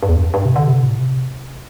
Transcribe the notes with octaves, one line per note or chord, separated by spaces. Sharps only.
G2
E2
G2
G2
C3
D3
C3
A2
C3